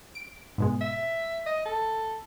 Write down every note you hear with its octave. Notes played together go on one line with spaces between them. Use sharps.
D7
G#2 B2 G#3
E5
D#5
A4